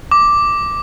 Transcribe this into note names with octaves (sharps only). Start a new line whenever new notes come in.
D6